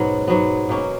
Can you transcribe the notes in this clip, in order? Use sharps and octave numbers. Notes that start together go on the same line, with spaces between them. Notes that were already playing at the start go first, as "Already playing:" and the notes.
Already playing: G#2 B2 F#3 B3 C#4
G#2 F#3 B3
B2 A#3 C#4